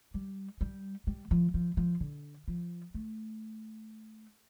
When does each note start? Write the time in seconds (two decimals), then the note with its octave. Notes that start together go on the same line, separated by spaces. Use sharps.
0.14 G3
0.61 G3
1.07 G3
1.31 F3
1.54 F3
1.77 F3
2.00 D3
2.48 F3
2.94 A3